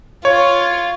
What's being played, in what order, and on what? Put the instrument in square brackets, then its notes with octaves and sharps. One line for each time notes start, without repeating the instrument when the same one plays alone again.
[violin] F4 [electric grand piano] C#5